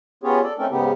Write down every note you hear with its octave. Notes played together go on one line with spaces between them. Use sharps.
B3 C#4 F4 G4 G#4 C#5
A4 D5
A3 C4 C#4 D#4 A4 A#4
G#2 C#3 B3 D#4 G4